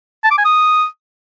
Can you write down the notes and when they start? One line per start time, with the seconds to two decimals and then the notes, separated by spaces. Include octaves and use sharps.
0.24 A5
0.31 D6
0.38 G#5
0.45 D#6